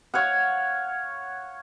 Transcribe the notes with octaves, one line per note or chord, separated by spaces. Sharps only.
C#5 F5 F#5